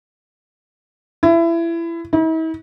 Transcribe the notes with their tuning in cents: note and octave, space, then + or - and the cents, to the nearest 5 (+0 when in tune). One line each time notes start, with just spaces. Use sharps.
E4 +25
E4 -45